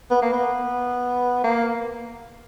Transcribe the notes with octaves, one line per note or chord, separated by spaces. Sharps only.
B3
A#3
B3
A#3